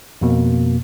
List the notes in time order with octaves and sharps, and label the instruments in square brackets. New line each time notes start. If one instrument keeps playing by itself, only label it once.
[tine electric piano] F2 B2 A#3